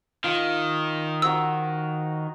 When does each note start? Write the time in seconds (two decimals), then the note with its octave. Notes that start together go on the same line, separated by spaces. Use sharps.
0.24 D#3 F4
1.22 D#4 F#4 C5 E6